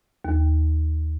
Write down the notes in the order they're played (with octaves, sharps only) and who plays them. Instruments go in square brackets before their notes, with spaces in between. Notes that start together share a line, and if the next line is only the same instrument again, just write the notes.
[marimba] D#2